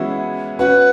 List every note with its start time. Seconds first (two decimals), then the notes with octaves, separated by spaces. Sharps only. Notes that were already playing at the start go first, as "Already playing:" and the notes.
Already playing: E3 G#3 B3 C#4 E4 F#4
0.59 C#4 F#4 B4